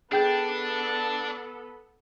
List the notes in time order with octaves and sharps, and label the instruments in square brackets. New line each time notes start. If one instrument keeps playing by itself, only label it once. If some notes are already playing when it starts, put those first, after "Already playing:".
[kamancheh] B3 A4 [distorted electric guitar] D4 [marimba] G#4 G5 G6